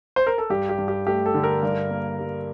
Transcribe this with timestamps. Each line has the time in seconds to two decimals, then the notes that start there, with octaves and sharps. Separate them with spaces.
0.16 C5
0.27 A#4
0.38 A4
0.50 G2 G4
0.69 G4
0.78 G2
0.88 G4
1.07 A3 G4
1.26 A4
1.34 D3
1.44 A#4
1.63 G2
1.90 A#3
2.19 G3